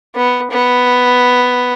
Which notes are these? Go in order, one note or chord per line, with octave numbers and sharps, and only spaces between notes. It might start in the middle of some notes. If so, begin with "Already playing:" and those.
B3
B3